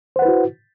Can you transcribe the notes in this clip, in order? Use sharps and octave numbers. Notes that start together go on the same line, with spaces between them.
E4 F#4 B4 C5 F#5